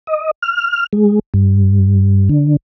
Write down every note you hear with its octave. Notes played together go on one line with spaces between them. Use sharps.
D#5
F6
G#3
G2
D3